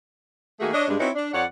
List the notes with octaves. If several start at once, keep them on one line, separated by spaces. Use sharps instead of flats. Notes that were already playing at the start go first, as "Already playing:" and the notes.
D#3 A3 A#3 F#4 G#4
D4 C#5 D#5
G2 G#3 D4
C4 D#4 E4 F#4 B4 C#5
D4
F2 C#5 D5 F#5